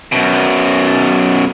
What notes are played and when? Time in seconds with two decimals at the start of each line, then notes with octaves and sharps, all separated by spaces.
0.12 F#2 B2